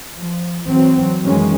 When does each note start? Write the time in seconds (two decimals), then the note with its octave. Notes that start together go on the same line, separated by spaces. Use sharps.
0.16 F3
0.67 E3 F#3 C4
1.21 F#2 D#3 E3 F#3 G#3 C#4